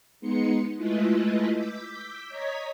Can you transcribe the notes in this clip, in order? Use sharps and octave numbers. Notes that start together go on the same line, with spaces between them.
G#3 B3 D#4 C6 C#7
G#3 A3 E4 F4 B4 D#5
D6 E6 G6 B6
C#5 D#5 A#5 G#6 B6